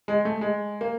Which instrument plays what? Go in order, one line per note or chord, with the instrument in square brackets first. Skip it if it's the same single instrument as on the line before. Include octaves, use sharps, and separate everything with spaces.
[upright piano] G#3
A3
G#3
A#3